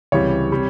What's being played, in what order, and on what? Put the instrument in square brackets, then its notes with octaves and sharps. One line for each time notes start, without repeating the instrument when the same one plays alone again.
[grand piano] C#2 C3 E3 G3 C#5
C3 G3